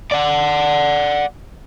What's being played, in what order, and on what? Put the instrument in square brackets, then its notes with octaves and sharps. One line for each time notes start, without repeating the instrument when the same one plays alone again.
[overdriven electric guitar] D5 F#5